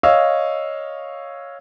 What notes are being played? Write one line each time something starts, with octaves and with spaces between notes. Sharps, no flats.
C#5 D#5 F5 E6